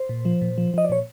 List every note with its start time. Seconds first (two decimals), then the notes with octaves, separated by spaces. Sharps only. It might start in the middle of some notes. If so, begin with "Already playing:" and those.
Already playing: C5
0.09 A#2
0.25 F3
0.42 A#2
0.58 F3
0.74 F3 D#5
0.85 D5
0.90 A#2 C#5